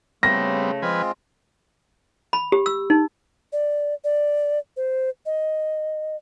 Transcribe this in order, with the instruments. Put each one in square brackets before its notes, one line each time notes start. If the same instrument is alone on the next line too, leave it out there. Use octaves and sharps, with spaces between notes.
[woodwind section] C#3 A3 [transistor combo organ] G3 B3 C4 [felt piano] A#6
[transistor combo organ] F3 B4 G#5 [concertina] G#3 C4 F4
[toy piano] B5
G4
E6
D#4
[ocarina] D5
D5
C5
D#5